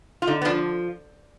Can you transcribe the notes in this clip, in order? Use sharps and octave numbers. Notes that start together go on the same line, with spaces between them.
F4
D3 D#4
B3
F3 D4